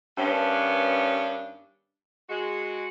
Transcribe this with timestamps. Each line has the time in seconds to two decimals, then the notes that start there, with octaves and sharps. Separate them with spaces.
0.17 G2 D#3 B3 C#4 D4
2.30 G#3 F#4